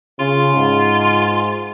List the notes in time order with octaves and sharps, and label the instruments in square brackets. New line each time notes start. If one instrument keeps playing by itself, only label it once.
[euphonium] C#3 [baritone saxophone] F4
[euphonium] G#2